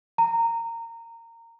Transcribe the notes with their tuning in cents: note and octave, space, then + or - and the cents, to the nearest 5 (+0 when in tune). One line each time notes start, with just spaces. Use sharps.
A#5 -20